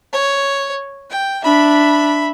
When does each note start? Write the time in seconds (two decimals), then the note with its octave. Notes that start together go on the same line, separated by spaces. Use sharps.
0.13 C#5
1.10 G5
1.44 D4 E5 B5